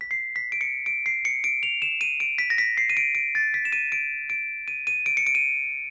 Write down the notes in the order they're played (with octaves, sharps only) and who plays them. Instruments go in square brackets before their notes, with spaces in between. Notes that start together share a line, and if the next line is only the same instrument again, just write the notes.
[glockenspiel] B6
C7
B6
D7
C#7
D7
C7
C#7
D7
F7
E7
D#7
D7
B6
A#6
B6
C7
D#7
D7
D7
A6
B6
E7
D#7
D7
D7
D#7
D#7
D7
C#7
D7
D#7